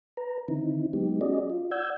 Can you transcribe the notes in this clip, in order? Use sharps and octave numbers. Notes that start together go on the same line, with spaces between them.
B4 A#5
D3 D#3 C4 D#4 E4
F#3 G#3 B3 D#4 G4
C#4 F#4 G#4 D5 D#5
F4
D5 F#5 E6 G6 G#6